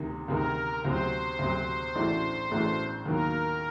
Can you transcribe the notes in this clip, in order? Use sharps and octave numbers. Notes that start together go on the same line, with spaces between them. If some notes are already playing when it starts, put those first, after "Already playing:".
Already playing: D2 C3 D#3
D2 C3 D#3 A#4
D2 C3 F#3 C5
D2 C3 F#3
A1 A2 A3 D4 F#4
A1 A2 A3 D4 F#4
D#2 D#3 F#3 A#3 A#4